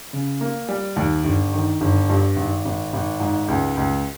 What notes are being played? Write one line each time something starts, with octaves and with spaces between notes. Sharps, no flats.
C#3
A#3
G3
D#2
G1
D#3
G1
G2
G#1
G#1
G#1
G#2
C#2
C#2